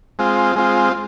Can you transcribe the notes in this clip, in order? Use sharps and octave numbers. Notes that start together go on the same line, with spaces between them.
G#3 C4 F4
G#3 C4 F4